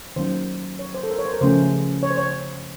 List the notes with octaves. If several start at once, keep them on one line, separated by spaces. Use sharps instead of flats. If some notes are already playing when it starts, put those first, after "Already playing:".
D#3 F#3 A#3 C#4 C5
C#5
C5
A4
A#4
C#5
C5
A#4
C#3 F3 A3 C#4 C5
C#5
C5
C#5